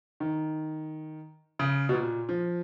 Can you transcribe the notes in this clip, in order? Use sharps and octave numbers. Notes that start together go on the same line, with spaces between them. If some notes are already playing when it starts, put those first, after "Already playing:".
D#3
C#3
B2
A#2
F3